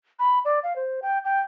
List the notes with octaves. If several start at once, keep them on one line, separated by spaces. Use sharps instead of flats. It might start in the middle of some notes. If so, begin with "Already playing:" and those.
B5
D5
F5
C5
G5
G5